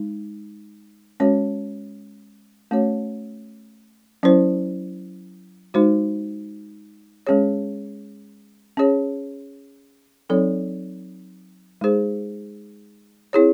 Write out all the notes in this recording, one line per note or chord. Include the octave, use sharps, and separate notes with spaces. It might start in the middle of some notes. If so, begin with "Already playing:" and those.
Already playing: G#3 D#4
G#3 C#4 F#4 C#5
A3 C#4 F#4 C#5
F#3 C#4 E4 C5
G#3 D#4 F#4 C5
G#3 C#4 G#4 C#5
C#4 G#4 C#5
F#3 C4 D#4 A4 C#5
G#3 D#4 G#4 C5
C4 E4 G#4 C#5